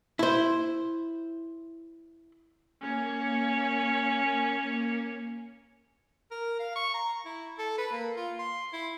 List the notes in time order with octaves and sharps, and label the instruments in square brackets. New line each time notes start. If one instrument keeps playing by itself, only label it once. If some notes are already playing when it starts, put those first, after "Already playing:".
[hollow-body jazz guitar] E4 C5
[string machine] A#3 [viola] C#4 C#5
[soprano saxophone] A#4
F5
C#6
A#5
E4
A4
B4
A#3
F4
C6
E4